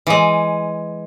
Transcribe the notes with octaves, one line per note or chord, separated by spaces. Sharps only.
E3 G#3